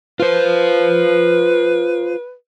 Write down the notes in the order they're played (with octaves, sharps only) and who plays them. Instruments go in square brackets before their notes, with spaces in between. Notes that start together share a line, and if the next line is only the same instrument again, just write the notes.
[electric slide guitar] F4 C5 [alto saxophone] B4